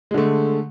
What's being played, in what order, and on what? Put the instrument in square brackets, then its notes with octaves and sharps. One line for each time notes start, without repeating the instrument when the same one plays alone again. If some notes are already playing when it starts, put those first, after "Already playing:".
[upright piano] G#3
D3
A3